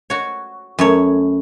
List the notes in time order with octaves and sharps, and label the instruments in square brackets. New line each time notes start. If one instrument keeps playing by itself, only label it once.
[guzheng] F#4 C#5
F#2 A3 C#5